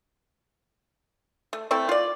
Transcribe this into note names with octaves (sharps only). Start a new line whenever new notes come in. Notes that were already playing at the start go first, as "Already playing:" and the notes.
A3
A3 C4 E4 A4
F4 D5